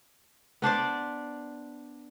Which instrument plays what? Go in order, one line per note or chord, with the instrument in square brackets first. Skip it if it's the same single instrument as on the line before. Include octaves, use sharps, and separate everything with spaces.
[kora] B3 D4 C5 D5